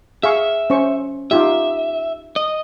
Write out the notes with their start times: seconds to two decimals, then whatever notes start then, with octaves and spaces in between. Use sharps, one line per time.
0.23 G#4 E5 F5 C#6
0.70 C#4 C5 C#6
1.31 D#4 F4 G4 E5
2.36 D#5